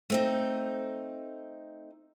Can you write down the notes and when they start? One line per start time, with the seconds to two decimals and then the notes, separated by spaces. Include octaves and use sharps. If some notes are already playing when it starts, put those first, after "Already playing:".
0.10 A3 C4 D#4